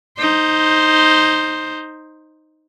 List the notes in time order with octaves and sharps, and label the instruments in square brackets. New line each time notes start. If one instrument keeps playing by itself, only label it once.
[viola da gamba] D#4 C5